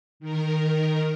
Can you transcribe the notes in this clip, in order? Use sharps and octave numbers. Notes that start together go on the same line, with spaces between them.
D#3 A#4